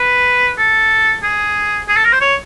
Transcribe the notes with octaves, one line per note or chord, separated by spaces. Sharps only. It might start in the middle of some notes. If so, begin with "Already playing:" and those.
Already playing: B4
A4
G#4
G#4
A4
A#4
C5
C#5